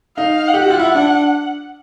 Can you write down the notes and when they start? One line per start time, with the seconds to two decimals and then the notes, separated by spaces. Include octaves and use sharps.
0.17 D#4 F5
0.48 F#5
0.54 G4
0.62 F#4
0.70 F4
0.79 E4
0.95 D4